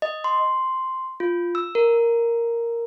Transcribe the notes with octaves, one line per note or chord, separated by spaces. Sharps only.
D#5
C6
F4
E6
A#4